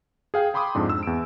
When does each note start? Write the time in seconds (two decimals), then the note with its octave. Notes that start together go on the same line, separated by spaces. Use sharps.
0.34 G#4 F5 G5
0.54 G5 B5 C6 D6 D#6
0.75 F2 G#2 D4
0.90 E6
1.03 E2 D7